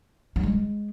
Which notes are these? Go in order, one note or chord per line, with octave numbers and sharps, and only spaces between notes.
F#3
G#3